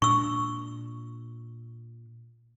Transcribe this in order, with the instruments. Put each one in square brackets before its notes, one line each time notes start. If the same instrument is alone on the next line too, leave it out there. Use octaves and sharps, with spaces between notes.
[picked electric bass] A#2 D4 [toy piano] C#6 E6